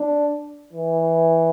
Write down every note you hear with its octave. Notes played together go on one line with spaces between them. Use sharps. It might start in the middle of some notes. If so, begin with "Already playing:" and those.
Already playing: D4
E3